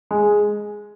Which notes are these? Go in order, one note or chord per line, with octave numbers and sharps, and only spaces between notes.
G#3